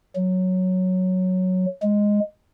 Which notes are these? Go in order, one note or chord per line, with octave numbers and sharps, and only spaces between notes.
F#3
G#3